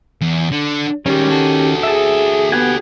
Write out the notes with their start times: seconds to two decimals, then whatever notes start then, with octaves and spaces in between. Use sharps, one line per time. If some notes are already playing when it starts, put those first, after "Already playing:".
0.21 E2
0.51 D3
1.06 D#3 G3 G#3 C#4 G4
1.29 F#4 A4
1.83 G#4 E5 A5
2.52 B3 G4 F#5 G#5